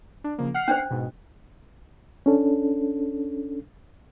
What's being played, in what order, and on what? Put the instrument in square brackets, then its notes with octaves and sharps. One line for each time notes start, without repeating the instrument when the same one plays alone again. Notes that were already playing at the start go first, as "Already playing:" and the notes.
[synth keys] D4
C#3 F3 A#3
F#5 F6 C7
[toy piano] C#4 D4 C5
[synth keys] G#2 B2
[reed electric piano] C#4 D4 A4